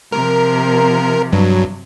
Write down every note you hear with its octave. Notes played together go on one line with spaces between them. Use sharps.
C3 F3 A#4
G2 F#3